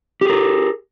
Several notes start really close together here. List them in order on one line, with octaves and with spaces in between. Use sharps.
G4 G#4 A#4